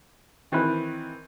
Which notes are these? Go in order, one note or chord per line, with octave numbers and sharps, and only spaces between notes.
D#3 E3 C4 B5 F#6